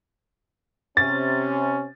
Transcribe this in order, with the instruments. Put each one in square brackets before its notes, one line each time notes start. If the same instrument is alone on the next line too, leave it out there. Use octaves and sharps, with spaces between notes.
[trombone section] C3 C#4 [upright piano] A6